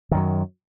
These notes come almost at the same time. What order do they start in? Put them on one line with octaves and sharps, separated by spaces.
D#3 F#2 F#3